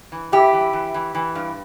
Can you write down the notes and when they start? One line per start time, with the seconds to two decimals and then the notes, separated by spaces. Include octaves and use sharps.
0.12 E3
0.32 G2 E4 G4
0.53 E3
0.73 E3
0.94 E3
1.15 E3
1.35 G2